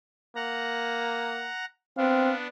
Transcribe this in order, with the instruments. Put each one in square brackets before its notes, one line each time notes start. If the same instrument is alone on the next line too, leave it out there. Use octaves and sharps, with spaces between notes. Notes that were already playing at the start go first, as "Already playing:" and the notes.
[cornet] A#3 [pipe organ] F#5 A#5
[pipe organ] B3 D4 [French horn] C4 [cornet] F5